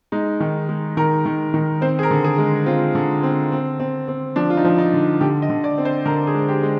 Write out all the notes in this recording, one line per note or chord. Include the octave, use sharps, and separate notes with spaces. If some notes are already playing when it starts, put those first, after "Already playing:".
G#3 D#4
D#3
G#3
D#3 A#4
D#3
D#3
C4 C5
G#4
A#4
D3
G#4
G#3
C4 F4
D3
C4
C4
C4
C4
F3 D4
F4
D#4
F3
D#4
D3
D3 G4
D#5
D3
D5
C4
C5
D3 A#4
G#4
G#3
G4
G#3